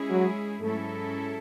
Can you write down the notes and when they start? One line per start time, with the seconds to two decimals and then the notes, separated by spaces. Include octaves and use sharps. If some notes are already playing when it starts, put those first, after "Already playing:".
Already playing: G#3 C#4 E4 G#4
0.10 F#3
0.61 G#2 F#3 A3 C#4 E4 A4